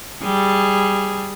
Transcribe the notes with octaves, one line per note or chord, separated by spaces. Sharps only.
G3 G#4